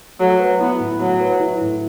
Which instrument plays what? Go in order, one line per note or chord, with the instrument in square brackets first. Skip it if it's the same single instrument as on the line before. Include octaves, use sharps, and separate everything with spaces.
[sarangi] F#3 [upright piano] A3
[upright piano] B4
[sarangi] B3 [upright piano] E4
[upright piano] A2
[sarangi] F#3 [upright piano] A3
[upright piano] B4
E4
A2